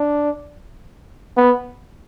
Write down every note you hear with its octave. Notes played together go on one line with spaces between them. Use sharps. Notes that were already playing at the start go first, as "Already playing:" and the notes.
Already playing: D4
B3